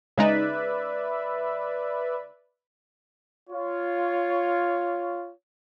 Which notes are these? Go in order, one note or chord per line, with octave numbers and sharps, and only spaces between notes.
C#3 G#3 D#4 B4 D5 E5
F4 C#5